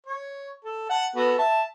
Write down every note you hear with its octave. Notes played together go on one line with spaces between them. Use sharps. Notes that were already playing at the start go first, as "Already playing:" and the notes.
C#5
A4
F#5 A5
B3 F#4 A4
E5 A5